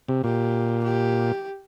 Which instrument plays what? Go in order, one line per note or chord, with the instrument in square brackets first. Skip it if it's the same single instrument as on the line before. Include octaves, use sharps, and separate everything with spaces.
[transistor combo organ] C3
[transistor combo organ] A#2 [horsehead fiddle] G4
[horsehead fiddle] G4